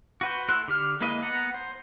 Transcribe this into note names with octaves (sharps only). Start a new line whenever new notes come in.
F#4 B4 C5
A3 E4 A4 C6 F#6
D3 G4 F6
G#3 A#3 E4 B4 D#5
B3 F#5 A#5
C5